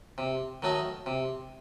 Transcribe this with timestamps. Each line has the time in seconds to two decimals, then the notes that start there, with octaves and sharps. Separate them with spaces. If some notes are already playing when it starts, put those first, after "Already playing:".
0.18 C3
0.62 D#3 F#3 A3 D#4
1.06 C3